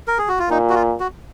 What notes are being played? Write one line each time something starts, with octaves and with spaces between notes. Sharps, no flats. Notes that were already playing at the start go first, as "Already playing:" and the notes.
A#4
G#4
F#4
F4
A#2 D#4
F#4
F4
F#4